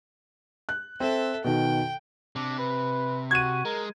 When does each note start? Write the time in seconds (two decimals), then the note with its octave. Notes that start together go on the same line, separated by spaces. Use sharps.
0.69 F#6
1.00 C4 A4 E5
1.44 B2 D#3 G5
2.36 C3 D4
2.58 B4
3.31 F#4 G#6 D#7
3.65 G#3 A#4